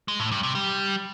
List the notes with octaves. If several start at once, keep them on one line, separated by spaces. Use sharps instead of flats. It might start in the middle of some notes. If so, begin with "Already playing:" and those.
G#3
A2
G2
C3
G3